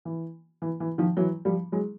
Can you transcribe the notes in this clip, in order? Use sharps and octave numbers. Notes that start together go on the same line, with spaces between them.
E3
E3
E3
D#3 F3
E3 F#3
F3 G3
F#3 G#3